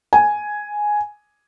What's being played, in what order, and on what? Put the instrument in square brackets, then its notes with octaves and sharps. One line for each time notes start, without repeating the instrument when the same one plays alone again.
[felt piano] G#5